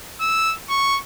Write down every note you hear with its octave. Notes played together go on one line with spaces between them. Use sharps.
E6
C#6